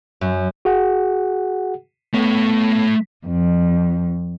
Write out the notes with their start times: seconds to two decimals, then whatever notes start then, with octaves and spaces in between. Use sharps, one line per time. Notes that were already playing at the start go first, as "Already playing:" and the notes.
0.21 F#2
0.65 F#4 G#4 F#5
2.14 A3 B3 C#5
3.26 F2